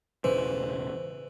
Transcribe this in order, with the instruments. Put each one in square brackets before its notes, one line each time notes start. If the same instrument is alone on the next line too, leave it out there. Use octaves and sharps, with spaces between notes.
[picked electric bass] E1 A1 C#3 [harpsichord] E3 [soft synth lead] C5